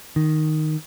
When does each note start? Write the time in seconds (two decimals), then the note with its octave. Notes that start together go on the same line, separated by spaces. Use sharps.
0.16 D#3